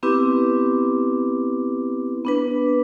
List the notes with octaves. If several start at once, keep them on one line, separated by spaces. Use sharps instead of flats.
B3 C4 E4 G4 B4 D6
B3 D4 B4